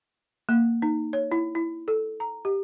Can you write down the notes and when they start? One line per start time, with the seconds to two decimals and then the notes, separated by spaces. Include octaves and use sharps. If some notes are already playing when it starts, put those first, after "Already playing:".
0.49 A#3
0.82 D#4
1.13 C#5
1.32 E4
1.55 E4
1.88 A4
2.20 A#5
2.45 G4